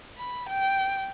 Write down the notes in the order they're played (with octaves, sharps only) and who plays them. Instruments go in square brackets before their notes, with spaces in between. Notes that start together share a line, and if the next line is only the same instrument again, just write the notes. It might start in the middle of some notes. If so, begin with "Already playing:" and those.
[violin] B5
G5